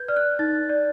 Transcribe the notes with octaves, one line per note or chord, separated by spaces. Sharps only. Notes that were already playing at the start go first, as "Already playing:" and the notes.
Already playing: B4 G6 G#6
D5 F6
F#6
D#4 A6
D5